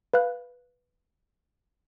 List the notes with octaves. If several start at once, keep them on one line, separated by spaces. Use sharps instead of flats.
B4 F5 F#6